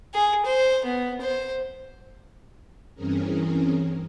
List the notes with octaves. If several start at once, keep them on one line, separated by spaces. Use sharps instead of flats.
G#4
C5
B3
C5
G2 E3 C4 C#4 G#4 A#4